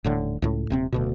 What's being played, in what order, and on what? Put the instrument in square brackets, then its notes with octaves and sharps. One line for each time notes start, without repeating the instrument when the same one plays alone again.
[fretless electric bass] D#1 A2 D3
C#2 A2
D#1 C3 C4
D1 D2 B2